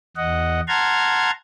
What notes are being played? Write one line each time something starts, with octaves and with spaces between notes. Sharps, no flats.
E2 D#5 F#5
F#5 A5 A#5 C6 F6 G#6